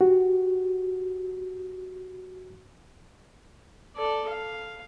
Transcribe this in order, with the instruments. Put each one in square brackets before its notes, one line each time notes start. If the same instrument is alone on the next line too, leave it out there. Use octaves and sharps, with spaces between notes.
[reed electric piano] F#4 G4
[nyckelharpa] A4 D5
F5